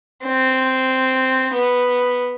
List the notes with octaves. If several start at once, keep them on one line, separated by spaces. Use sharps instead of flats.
C4
B3